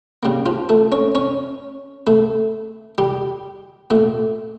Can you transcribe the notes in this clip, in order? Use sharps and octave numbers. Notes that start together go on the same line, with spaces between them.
C#3 G3 A#3
F3 F4
A3 A4
C#4 C#5
C#4 C#5
A3 A4
G3 G4
A#2 A3 A4